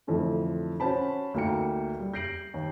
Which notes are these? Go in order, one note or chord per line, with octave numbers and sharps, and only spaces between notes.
F2 A2 D3 E3
C#4 F#4 C5 A5 B5
D2 A#3 D#4 G5 C#7
G3
G6 A#6 C7 D7 F#7
D#2